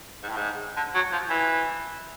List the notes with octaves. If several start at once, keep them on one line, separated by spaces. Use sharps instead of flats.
G#2
A2
G#2
D3
F#3
F3
E3